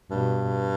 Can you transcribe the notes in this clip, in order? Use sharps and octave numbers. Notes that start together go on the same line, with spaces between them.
G2 B2